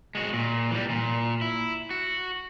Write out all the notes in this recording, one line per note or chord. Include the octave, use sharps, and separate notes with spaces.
G#3 F#4
A#2
E3 G3
A#2
E4
F#4